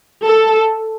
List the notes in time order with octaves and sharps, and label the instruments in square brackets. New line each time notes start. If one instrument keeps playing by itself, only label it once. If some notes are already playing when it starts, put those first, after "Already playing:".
[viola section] A4